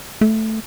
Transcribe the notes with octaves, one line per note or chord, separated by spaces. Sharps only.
A3